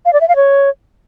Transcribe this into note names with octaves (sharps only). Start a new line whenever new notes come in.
F5
D5
E5
F5
C#5